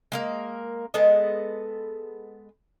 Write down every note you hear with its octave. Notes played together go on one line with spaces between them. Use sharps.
G#3 A#3 A#4
G#3 B3 A4 D#5